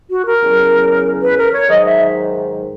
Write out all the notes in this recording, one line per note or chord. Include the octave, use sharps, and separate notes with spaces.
F#4
A#4
E2 C#3 F#3
B4
A#4
C#5
G#2 D#3 F#3 D#5
E5